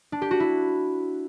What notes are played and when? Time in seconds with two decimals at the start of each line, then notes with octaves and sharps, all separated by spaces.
0.12 D4
0.22 G4
0.31 F#4
0.40 E4